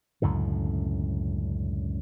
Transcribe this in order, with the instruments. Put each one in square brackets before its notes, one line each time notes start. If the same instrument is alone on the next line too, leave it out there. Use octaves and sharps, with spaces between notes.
[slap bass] C#2 F#2 A2 D3